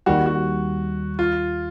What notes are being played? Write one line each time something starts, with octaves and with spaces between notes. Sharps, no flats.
D#2 D#3 G3 F#4
F#4
F4